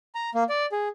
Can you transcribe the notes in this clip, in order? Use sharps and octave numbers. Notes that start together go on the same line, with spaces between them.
A#5
A#3
D5
G#4